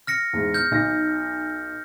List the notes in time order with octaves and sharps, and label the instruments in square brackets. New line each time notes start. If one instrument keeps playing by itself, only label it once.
[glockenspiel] F6 A#6 C#7
[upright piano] E2 G#2
[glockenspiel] F6 G6
[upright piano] B1 D#4 A#6